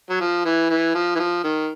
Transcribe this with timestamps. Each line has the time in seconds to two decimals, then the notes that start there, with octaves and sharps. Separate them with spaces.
0.10 F#3
0.21 F3
0.45 E3
0.70 E3
0.94 F3
1.15 E3
1.19 F3
1.44 D#3